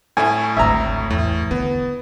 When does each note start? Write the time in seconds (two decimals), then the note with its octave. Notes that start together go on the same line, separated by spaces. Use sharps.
0.17 A2 A3 E4 G#5
0.57 G#1 D2 E5 A#5
1.10 E2 A2
1.51 D3 B3